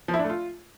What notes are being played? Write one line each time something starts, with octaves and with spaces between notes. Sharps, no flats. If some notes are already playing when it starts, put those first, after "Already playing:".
F3
E4
D4
A3
F4